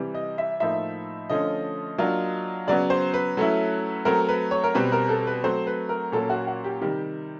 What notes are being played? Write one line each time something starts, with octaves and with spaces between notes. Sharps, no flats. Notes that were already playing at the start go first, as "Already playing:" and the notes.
Already playing: C3 E3 G3
D#5
E5
A2 F3 A#3 D#4 E5
D3 F3 A3 C#4 D#5
F#3 A#3 D4 F4
C#3 F#3 B3 D5
C5
B4
F#3 A3 C#4 E4
F#3 A3 C4 A#4
B4
C#5
A#4
B2 G3 C4 B4
A#4
A4
B4
F#3 A3 C4 C5
B4
A#4
A#2 F#3 A#3 C#4 A4
F#4
F#4
G4
C3 D#3 G3 G4